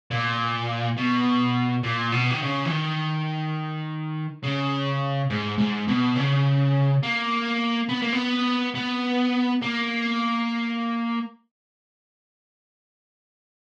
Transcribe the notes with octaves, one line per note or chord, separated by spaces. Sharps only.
A#2
B2
A#2
B2
D#3
C#3
E3
D#3
C#3
G#2
G#2
B2
C#3
A#3
B3
A#3
B3
B3
A#3